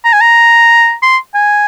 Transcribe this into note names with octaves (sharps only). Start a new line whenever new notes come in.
A#5
G#5
A#5
C6
G#5